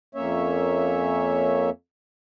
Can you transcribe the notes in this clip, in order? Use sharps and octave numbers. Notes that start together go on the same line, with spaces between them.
F2 A#3 C#4 C#5 E5